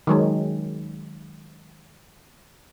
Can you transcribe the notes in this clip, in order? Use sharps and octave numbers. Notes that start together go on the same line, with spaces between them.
D#3 F#3 G#3